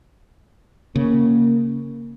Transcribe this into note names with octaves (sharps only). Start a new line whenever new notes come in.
C#3 A#3